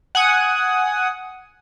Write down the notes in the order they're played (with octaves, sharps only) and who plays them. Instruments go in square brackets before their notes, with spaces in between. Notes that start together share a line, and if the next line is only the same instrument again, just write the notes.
[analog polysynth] F#5 G#5 D#6